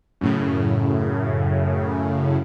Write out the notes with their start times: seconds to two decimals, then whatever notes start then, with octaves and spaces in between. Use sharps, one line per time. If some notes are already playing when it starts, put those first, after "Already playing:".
0.21 F#2 A2 C#3